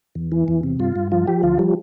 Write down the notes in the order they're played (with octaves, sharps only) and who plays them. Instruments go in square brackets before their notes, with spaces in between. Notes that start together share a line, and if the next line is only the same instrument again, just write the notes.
[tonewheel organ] E2
E3
E2
C3
G2 F4
G2
F3 F4
F3 G4
D2 F4
F3 G3